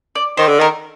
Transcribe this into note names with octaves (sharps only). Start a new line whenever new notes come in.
D5
D#3 C5
D3
D#3 A#4